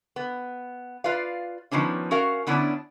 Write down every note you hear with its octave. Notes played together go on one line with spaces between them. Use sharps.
B3
F4 B4 D5 F5
D#3 F3 B3 C#4 D4
C#4 F#4 A#4 F5
D3 B3 C#4 D4 E4